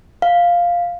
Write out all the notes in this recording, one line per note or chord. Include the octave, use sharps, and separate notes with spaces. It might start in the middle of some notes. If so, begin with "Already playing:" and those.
F5